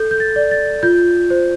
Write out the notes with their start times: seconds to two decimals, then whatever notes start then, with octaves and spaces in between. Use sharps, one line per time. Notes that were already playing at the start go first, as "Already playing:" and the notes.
Already playing: A4 G6
0.11 G6
0.20 A6
0.36 D5
0.51 A6
0.83 F4 G6
1.30 C5